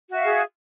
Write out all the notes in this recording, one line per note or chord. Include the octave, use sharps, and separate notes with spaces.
F#4 G#4 E5 F5